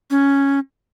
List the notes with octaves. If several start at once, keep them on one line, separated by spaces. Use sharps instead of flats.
C#4